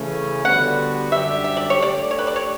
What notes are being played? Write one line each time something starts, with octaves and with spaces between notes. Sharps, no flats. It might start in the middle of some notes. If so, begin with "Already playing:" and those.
Already playing: C#3 E3 A3 C#4
D3 G3 B3 F#4 B4 F#5
F#2 D3 G3 D4 G4 E5
E5
D5
C#5
A3 D4 G4 D5
C#5
B4
D5
C#5